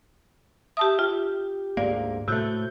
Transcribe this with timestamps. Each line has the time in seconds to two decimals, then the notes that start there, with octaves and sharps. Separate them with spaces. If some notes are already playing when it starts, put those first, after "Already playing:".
0.77 G4 E5 A5 D#6
0.99 F4 G4
1.77 D2 G#2 A#3 D5
2.28 A2 C3 A3 F#4 G6